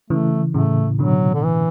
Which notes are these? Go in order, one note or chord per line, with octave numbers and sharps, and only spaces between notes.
C#3 E3 A3
A2 C#3 A3
B2 D3 F#3
D3
E3